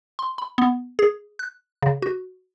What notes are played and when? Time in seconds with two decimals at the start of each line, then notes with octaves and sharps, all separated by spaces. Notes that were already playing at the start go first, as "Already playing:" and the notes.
0.19 C6
0.38 B5
0.58 B3
0.99 G#4
1.39 F#6
1.83 C#3
2.02 F#4